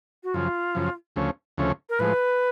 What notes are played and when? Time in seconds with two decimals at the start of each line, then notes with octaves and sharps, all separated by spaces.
0.23 F#4
0.34 F#2 C#3 F3 F4
0.75 F#2 C#3 F3
1.16 D2 C#3 F3 A3 C#4
1.58 D2 C#3 F3 A3 C#4
1.89 A#4
1.99 A2 F3 G#3 B4